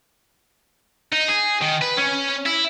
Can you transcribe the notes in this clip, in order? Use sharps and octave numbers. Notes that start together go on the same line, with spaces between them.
D#4
G#4
D#3
B4
C#4
E4